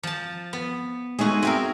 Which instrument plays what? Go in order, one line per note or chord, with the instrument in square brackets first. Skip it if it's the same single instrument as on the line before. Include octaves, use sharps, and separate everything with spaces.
[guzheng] F3 A5
B3
[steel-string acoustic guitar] G#3 A3 D#4 [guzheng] F#4 G#4
[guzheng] C4 G#4 A#4 [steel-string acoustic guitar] E5